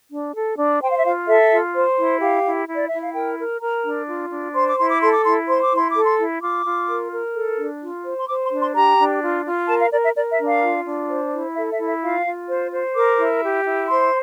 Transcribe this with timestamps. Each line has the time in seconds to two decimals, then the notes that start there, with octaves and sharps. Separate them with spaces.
0.11 D4
0.35 A4
0.57 D4
0.81 C5 G5
0.90 F5
0.98 E5
1.05 F4 F5
1.28 A4 E5
1.51 F4
1.74 C5
1.98 E4
2.21 G4 F5
2.44 E4
2.68 E4
2.74 D5
2.88 E4 E5
3.02 F5
3.15 A#4 G5
3.38 A#4
3.61 A#4 A#5
3.84 D4
4.08 F4
4.31 D4
4.55 C5 C6
4.67 D6
4.78 E4 C6
4.89 D6
5.01 A4 C6
5.12 D6
5.24 E4 C6
5.48 C5 C6
5.62 D6
5.72 E4 C6
5.90 D6
5.96 A4
6.04 C6
6.19 E4
6.42 F4 D6
6.65 F4
6.89 A#4
7.12 A#4
7.35 A4
7.58 D4
7.82 F4
8.05 C5
8.19 C6
8.28 C5 D6
8.44 C6
8.52 D4
8.60 C6
8.75 G4 A#5
8.98 D4
9.22 F4
9.45 F4
9.69 A#4 A5
9.80 F5
9.92 A#4 D5
10.03 E5
10.15 A#4 D5
10.30 E5
10.39 D4
10.46 F5
10.63 F4
10.86 D4
11.09 C5
11.32 E4
11.55 A4 E5
11.71 E5
11.79 E4
11.86 E5
12.02 F4 F5
12.26 F4
12.49 C5
12.72 C5
12.95 A#4 D6
13.19 E4
13.43 G4
13.65 E4
13.89 C5 C6